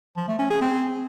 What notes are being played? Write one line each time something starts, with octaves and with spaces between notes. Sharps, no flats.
F3
A3
C#4
G#4
C4